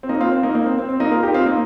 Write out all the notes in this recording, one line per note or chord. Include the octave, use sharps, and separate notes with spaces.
C4
A#3 D#4
C4 F4
C4
A#3 D#4
A#3 D#4
C4
C4
C4
A#3 D#4
F4 A#4
D#4 G4
C4 F4
A#3 D#4